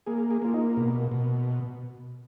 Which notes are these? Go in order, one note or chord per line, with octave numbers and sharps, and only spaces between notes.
A#3 G#4
G#4
A#3 F4
D#4
B2
B2